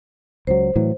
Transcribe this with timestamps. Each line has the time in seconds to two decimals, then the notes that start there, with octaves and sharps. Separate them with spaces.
0.47 C#2 F#3 C5
0.76 A2 E3 F#3